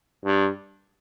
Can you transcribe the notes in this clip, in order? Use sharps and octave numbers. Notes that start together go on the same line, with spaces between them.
G2